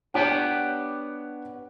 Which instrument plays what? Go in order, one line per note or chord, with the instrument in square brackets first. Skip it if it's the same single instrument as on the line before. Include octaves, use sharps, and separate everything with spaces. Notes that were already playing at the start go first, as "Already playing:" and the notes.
[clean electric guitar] B3 G4 G5 [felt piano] D4 C#5 F#5